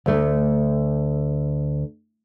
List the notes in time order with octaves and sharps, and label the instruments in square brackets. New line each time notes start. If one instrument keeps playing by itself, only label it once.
[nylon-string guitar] D2 A3